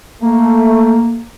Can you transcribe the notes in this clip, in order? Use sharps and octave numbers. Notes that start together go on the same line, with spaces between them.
A3 A#3